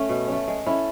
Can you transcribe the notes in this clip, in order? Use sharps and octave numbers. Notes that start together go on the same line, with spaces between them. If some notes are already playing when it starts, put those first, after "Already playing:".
Already playing: A3 C#4
B2
A3 C#4
G#3
C#4 E4 A4